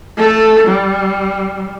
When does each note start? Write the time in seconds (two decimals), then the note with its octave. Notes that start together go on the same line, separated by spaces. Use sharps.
0.17 A3 A4
0.67 G3